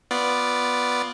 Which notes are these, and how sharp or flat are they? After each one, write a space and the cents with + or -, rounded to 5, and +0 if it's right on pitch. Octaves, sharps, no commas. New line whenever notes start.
B3 +0 F4 +5 D5 +0